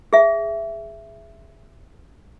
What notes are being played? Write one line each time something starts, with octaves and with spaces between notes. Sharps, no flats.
G#4 E5